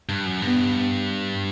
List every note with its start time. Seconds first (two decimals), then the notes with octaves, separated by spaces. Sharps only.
0.09 G2
0.26 F#2
0.42 G2 B3